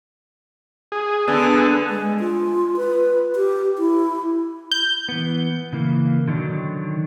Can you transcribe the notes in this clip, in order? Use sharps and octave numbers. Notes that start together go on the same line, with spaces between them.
G#4
D3 B3 G#4 A4
G#3
F4
B4
G4
E4
G6
E3 B3
C#3 E3 A#3
D3 D#3 F#3 D4